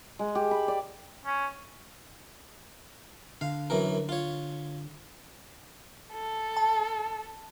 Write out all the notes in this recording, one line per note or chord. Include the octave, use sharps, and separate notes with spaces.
G#3
G4
B5
D5
C#4
D3 F5
F#2 E3 A#4
F4 C#5
A4
A5